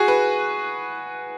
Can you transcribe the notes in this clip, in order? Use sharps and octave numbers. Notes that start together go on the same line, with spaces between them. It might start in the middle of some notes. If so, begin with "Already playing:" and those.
Already playing: F#4 G#4
B4